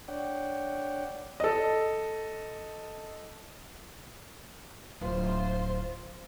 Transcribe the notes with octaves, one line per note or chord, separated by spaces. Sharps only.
D4 C#5 D5 F#5 G5
A4 D#5
D1 F4 C5